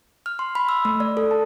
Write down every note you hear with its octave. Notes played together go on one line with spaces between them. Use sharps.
F6
C6
B5
E6
A3
D5
A4
A5